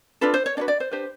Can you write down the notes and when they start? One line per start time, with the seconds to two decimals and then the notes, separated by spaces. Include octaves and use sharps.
0.21 D4 F4 A4 B4
0.34 C5
0.46 C#5
0.57 D4 F#4 B4 D5
0.68 D5
0.80 C5
0.91 D4 G4 B4 C5